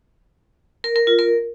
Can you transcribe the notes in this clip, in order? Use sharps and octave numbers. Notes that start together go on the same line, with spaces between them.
A#4
A#4
F4
A#4